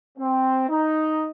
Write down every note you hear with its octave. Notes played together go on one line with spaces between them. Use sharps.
C4
D#4